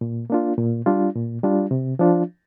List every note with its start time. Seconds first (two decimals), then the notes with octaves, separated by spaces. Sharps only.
0.01 A#2
0.30 A#3 D4 F4
0.58 A#2
0.86 G3 D4 F4
1.15 A#2
1.43 G3 D4 F4
1.71 C3
1.99 F3 D4 F4